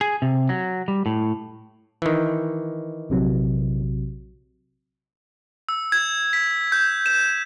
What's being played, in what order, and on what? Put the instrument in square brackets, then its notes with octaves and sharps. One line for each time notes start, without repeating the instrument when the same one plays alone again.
[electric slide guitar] G#4
C3
F#3
G3
A2
[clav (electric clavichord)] D#3 E3
[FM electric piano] A#1 C3 F#3
[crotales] E6
G#6
B6
G6
E7